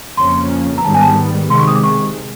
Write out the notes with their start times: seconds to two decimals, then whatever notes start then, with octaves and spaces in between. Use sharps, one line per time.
0.17 F2 C#3 F3 A#3 C#4 C6
0.78 A#5
0.84 G#2 D#3 G3 B3 A5
0.94 G#5
1.01 A5
1.50 C3 D#3 G#3 C6
1.58 C#6
1.68 D#6
1.76 D6
1.83 C#6